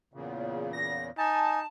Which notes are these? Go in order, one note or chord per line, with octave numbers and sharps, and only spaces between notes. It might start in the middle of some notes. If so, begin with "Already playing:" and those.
E2 A#2 C#3
A#6
D#4 G#5 A5